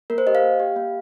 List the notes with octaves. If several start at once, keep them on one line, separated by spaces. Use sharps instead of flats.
A#3 A#4
C5
G4 D#5
F5
A#3
G4
A#3